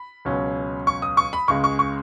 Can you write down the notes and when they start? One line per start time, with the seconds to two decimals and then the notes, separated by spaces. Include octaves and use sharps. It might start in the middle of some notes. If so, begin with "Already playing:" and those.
Already playing: B5
0.25 C#2 B2 F#3 C#4
0.87 C#6
1.02 D#6
1.17 C#6
1.33 B5
1.48 C#2 C#3 G#3 C#6
1.64 C#6
1.79 C#6